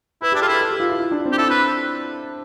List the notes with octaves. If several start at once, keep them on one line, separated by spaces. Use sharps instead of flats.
E4 B4
D4 G4
F4 A4
E4 B4
A4
G4
F4
E4
E4
D4
C4
G4
E4 A4
B4